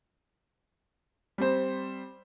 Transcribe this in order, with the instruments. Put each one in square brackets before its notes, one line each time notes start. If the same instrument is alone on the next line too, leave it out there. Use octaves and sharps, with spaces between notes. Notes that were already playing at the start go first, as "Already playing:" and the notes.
[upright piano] G3 C4 C5